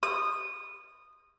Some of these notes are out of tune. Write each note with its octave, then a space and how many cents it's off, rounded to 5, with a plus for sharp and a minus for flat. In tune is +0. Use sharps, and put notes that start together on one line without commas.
D#6 -15